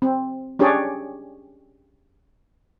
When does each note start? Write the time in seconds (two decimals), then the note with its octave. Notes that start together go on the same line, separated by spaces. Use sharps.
0.02 C4
0.59 C#4 D4 G4 G#4 C#5 D5